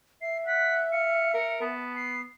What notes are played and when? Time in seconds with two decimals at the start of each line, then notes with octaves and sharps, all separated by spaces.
0.21 E5 C7
0.47 F#5 B6
0.92 F5 C#7
1.34 A#4
1.61 B3 A5
1.96 C7